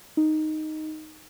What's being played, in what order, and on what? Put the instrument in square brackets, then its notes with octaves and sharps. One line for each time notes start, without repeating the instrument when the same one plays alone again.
[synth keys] D#4